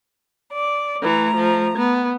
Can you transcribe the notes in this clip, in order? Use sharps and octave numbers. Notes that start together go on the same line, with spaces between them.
D5
E3 A3 A#5
F3
B3